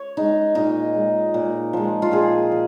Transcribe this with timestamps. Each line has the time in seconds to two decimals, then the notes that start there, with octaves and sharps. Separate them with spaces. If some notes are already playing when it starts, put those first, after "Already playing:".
Already playing: C#5
0.17 G#3 D#4
0.55 A#2 D#4
0.94 G#3
1.34 A#2
1.73 F3 G#3
2.02 F4
2.12 A#2 G#4
2.52 F3